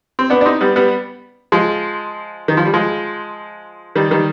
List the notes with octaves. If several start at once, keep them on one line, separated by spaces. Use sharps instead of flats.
C4
B3 D4
D4
C4 D#4
G3 B3
G3 B3
F3 G#3
D#3
F3
G3
F3 G#3
D#3 G3
D#3 G3